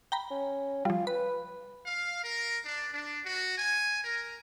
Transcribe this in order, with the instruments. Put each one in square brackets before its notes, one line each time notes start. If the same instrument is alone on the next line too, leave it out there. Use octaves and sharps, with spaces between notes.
[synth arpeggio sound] G5 A#5 B5
[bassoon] C#4
[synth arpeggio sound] F3 G3 [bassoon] F4
[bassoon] B4 [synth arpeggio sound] B5
[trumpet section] F5
A#4
D4
D4
F#4
G#5
A#4